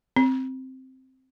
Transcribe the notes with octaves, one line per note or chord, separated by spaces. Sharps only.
C4